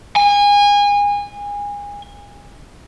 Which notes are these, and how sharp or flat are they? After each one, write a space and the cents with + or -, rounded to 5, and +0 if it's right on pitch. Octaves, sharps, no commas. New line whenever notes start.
G#5 -25